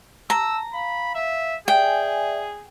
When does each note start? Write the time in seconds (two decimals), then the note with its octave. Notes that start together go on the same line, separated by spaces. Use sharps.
0.30 A5 A#5 E6
0.74 F5 B5
1.15 E5
1.68 G#4 D5 E5 G5 G#5